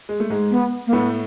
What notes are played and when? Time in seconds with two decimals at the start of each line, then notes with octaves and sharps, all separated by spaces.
0.09 G#3
0.20 A3
0.30 G#2 G#3
0.51 B3
0.86 A#3
0.93 A2 A3 B3